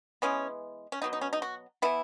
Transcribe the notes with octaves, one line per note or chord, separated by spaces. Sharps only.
E3 G#3 B3 C#4
C#4
B2 F#3 B3 D#4
D#4
C#4
D#4
F#4
E3 B3 E4